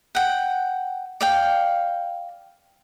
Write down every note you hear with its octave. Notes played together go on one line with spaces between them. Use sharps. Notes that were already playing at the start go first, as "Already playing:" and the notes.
F#5 G5
D5 F5 G5